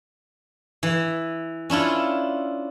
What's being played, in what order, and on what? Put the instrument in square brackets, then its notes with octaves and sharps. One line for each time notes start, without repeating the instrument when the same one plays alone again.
[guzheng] E3
C#4 D4 E4 F4